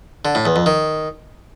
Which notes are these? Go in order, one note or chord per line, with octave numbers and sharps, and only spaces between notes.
D3
A2
E2
F2
D#3